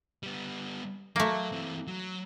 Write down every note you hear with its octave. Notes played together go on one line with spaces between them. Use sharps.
G3 B3
F#3 A3 A#3
E3 C4
F#3